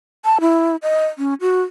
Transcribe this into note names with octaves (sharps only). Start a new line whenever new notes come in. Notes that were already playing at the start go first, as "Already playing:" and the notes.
A5
E4
D#5
C#4
F#4